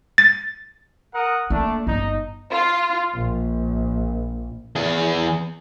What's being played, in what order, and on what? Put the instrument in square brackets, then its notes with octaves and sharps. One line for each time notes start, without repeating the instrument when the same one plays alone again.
[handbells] A6
[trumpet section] A#4 F#5 D#6
[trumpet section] A3 D4 [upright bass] A#3
[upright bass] G1 [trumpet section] D#4
[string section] F4
A#1
[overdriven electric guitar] E2 G#4